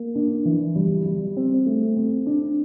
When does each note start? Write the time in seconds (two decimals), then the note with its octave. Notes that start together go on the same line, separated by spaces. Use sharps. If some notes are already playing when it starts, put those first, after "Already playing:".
Already playing: A#3
0.15 D4
0.45 E3
0.76 G3
1.06 G3
1.37 C4
1.66 A3
1.97 C4
2.26 D4